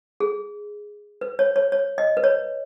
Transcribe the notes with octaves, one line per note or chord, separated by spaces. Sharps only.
G#4
B4
C#5
C#5
C#5
D#5
B4
C#5